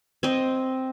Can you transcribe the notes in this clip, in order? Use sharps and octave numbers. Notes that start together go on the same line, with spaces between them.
C4 D#5